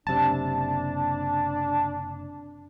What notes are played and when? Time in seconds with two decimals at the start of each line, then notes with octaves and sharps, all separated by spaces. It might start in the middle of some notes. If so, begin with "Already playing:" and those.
0.07 F#1 C3 D4 A5